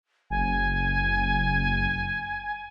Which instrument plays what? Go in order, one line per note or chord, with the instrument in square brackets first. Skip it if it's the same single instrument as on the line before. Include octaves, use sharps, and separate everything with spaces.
[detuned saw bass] F#1 [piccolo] G#5